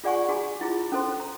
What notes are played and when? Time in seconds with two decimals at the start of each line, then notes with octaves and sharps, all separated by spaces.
0.04 F4 G#4 D5 F#5 G#5 C#6
0.29 F#4 G#4 G#5 A#5
0.61 E4 F4 G#4
0.92 C#4 A4 C5 C6
1.20 A#5